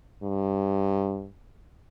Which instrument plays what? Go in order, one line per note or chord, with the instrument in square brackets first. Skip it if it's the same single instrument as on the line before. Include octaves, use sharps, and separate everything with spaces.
[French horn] G2